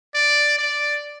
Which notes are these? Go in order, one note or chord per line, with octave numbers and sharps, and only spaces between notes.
D5
D5